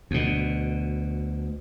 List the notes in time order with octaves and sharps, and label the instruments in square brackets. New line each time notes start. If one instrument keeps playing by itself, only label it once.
[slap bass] D2 B2